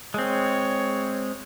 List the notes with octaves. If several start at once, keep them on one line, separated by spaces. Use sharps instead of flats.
G#3 C4 C#5